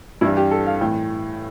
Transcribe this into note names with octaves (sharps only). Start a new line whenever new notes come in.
G2 E3 G3 E4
G4
A4
F5
A2 E3 G5